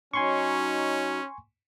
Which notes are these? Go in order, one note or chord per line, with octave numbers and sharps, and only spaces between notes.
F#3 C#4 D#4 G#5 C6 C#6